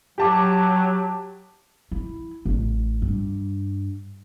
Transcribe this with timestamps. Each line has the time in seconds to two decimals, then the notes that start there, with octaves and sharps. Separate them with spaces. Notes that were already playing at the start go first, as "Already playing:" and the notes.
0.18 F#3 G4 A5 D6
1.92 E4
2.45 A1
3.02 G2